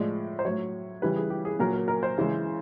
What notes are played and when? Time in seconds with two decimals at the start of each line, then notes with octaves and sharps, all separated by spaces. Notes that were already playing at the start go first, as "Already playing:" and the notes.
Already playing: A2 F3 G#3 D5
0.39 C5
0.45 A2 F#3 C#5
1.02 C#3 E3 G3 B4
1.16 G#4
1.30 G4
1.45 G#4
1.59 A#2 F#3 A#4
1.73 A#4
1.88 A#4
2.03 C5
2.18 C#3 E3 G#3